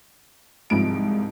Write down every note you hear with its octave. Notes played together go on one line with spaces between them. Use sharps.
C2 G#2 F3 D7